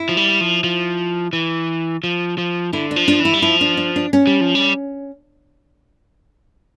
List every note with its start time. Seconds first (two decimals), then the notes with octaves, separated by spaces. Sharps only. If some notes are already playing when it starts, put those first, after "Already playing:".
Already playing: E4
0.09 F3
0.17 G3
0.41 F3
0.64 F3
1.33 E3
2.04 F3
2.38 F3
2.73 D3 E4
2.91 D4
2.96 F3
3.08 D4
3.20 E3
3.25 E4
3.34 G3
3.42 F3 E4
3.61 D4
3.77 D4
3.96 D4
4.13 C#4
4.27 G3
4.41 F3
4.55 G3